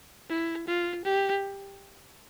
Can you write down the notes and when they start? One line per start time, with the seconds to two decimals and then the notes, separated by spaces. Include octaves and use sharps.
0.29 E4
0.67 F4
1.04 G4